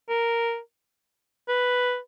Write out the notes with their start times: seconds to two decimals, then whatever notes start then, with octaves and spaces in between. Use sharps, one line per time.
0.09 A#4
1.49 B4